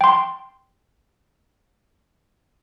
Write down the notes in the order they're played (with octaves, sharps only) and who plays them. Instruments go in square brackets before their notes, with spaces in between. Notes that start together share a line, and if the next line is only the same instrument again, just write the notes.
[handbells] G5 C6